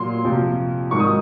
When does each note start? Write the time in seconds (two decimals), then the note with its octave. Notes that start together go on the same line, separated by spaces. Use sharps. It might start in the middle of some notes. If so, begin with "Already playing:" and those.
Already playing: A#2 F#3 C6
0.25 F2 C3 F3
0.91 G#2 D#3 F#3 C#6
1.00 D#6